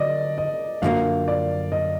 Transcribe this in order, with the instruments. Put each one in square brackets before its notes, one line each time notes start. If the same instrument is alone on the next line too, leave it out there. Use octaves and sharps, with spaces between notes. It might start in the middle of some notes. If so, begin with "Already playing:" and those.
Already playing: [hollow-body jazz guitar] D3 F#3 [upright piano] D5 D#5
[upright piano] D#5
[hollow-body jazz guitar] F#2 D3 F3 A#3 [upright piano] F5
[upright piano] D5
D#5